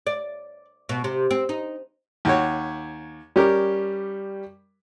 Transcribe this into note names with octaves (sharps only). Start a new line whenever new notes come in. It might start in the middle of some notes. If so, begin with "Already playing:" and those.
D5
B2
C3
C4
D#4
D#2 F#4 C#5
G3 C#4 G4 A#4